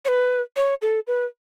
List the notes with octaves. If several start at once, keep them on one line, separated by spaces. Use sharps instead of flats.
C#5
B4
C#5
A4
B4